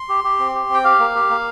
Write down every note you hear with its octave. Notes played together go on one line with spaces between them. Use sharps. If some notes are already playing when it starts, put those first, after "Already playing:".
Already playing: C6
G4
G4
C4
G4
C4
G5
G4 F5
A#3
G4
A#3